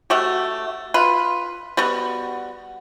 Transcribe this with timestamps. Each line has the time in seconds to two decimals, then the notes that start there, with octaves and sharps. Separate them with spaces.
0.10 A3 F#4 G4
0.94 F4 B4
1.77 G3 B3 F#4